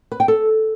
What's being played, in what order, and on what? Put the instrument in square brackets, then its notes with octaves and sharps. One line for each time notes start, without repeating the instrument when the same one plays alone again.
[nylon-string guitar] B4
G5
A4